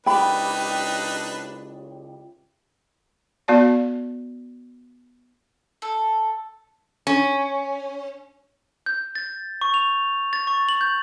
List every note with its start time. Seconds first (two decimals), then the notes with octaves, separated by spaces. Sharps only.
0.06 C#2 D4 D#4 G4 B4 G5 B5
3.48 B3 F#4 D5 A5
5.82 A4
7.07 C#4
8.86 G6
9.15 A6
9.61 C#6
9.74 F7
10.33 A6
10.47 C#6
10.69 F#7
10.81 G6